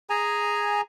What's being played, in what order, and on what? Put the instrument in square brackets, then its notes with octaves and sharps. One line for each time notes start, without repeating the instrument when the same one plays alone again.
[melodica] G#4 G#5 A#5